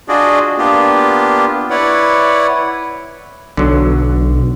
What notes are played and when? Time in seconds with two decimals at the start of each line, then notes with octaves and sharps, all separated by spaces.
0.09 D4 F4 F#4 G#4 D5 D#5
0.58 A#3 B3 D4 F4 G4
1.70 E4 B4 C#5 D5 F#5
3.57 B1 D3 F#3